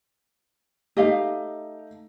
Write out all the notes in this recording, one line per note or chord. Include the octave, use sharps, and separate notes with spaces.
A3 D#4 G4 D#5 F5